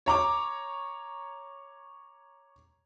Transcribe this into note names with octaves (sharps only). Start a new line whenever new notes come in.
C#5 A#5 D6